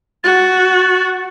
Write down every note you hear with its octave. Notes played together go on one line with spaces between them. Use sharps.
F#4 A6